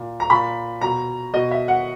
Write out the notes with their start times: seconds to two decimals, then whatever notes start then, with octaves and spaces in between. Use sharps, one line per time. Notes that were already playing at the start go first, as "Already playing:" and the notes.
Already playing: A#2
0.20 A#5
0.30 A#2 B5
0.81 B2 A#5
1.34 B2 D#5
1.51 E5
1.68 F#5